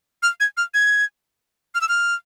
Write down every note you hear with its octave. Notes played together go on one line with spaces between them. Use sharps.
F6
G#6
F6
G#6
F6
E6
F6